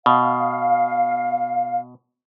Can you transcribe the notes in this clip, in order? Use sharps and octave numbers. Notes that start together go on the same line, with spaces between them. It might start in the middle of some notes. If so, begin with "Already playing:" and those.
B2 F5